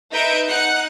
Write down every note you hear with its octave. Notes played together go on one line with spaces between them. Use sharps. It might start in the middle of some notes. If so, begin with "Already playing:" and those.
D#4 B4 D#5 E5 G6 D7
D#4 F#5 F#6 C#7